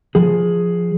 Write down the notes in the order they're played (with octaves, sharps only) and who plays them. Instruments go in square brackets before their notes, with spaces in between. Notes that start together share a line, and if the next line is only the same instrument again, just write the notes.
[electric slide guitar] F3 G#4